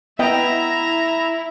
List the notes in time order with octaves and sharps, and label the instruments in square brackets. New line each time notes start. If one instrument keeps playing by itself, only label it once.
[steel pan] B3 D#5 G5 [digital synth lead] E4 [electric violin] E5 A#5